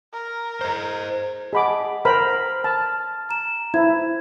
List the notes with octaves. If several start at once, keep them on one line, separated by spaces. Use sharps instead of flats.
A#4
C5 D#5
G#4 D#5 F#5 A5 B5 D6
A#4 C5 B5 F6
A5 F6
A#5 E7
E4 C5 G#6